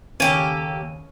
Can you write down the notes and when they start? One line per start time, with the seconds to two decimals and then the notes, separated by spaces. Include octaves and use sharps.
0.20 D#2 C#3 A#3 C#4 G4 A4 D#7